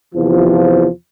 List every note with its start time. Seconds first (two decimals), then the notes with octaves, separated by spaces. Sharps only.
0.14 E2 C3 F3